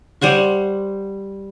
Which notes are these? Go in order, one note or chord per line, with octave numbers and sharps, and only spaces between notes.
G3 C5 F#5 C#6